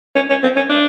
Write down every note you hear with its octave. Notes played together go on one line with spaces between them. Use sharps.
C#4
C#4
C4
C#4
D4